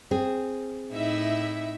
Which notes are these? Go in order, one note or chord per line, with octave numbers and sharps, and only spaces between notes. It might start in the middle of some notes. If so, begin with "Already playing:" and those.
C4 G#4
A2 D#4 E4 E5